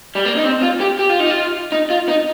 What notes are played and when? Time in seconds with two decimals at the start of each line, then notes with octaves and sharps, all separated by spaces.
0.15 G3
0.25 A#3
0.37 D#4
0.44 C4
0.62 F4
0.80 G4
0.99 G4
1.09 F4
1.20 D#4
1.30 F4
1.72 D#4
1.90 F4
2.08 D#4